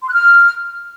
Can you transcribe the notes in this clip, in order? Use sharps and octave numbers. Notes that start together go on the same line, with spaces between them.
C6
F#6
F6